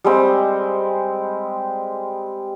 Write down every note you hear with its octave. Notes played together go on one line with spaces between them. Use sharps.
G3 G#3 C4